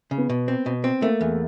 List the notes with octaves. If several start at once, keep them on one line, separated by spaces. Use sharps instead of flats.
C#3
B3
B2
C4
B2
C4
A3 A#3
E2